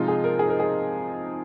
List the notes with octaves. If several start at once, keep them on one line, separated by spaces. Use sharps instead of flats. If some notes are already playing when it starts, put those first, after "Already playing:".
Already playing: C3 F3 G#3 D#4 F4
G#4
A#4
G#4
A#4
G#4